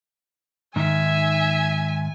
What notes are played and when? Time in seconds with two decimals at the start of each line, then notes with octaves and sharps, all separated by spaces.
0.76 G#2 D#3 E5 G#5